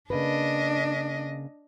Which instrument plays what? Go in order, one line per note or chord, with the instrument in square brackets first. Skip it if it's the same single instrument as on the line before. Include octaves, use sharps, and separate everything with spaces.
[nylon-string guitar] C#3 A#3 B4 [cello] D4 D#5